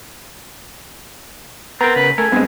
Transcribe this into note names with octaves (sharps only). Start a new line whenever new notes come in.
B3 C4 A#4 A#5
C#3 B4
A3 A4 A#4 G#5
G2 G#3 B3 C4